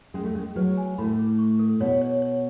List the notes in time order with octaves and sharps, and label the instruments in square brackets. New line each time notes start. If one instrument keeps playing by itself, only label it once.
[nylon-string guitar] G#3 [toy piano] C#4
[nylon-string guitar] A3
[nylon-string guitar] G#3 [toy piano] C#4
[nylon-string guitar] F#3 [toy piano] B4
[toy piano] G#5
[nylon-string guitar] A2 A3 [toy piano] B5
[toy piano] G#4
C#6
A4
[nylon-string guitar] B2 B3 [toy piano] C#5
[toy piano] C#5
C#5